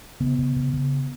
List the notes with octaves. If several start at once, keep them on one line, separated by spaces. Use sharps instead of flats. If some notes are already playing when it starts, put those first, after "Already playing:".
C#3 B3
C#3
C#3
C#3